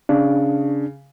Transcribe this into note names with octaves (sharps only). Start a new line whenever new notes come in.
C#3 D4